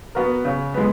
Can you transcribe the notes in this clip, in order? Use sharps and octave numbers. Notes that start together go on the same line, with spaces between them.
B3 F#4 A#4
C#3
G#3 B3